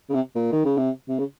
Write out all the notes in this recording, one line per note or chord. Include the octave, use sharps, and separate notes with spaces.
C#3
C3
A#2
D#3
C#3
C3
C3
C#3